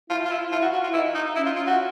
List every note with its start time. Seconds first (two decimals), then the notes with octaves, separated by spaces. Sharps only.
0.10 E4 F4
0.25 F4
0.31 E4
0.52 E4 F4
0.62 F#4
0.73 F#4
0.84 F4
0.94 D#4 E4
1.15 D#4
1.36 C#4 E4
1.46 F4
1.56 F4
1.67 F#4